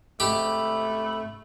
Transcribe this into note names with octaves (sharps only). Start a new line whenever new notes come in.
G#2 C3 A3 G4 B5